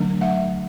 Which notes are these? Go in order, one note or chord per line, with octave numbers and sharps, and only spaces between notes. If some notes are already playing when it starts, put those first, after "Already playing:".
Already playing: D3 F#3 A3 D4
E5 F#5